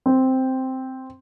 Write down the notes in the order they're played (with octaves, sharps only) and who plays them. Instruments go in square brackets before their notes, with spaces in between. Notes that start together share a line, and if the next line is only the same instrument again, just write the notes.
[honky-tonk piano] C4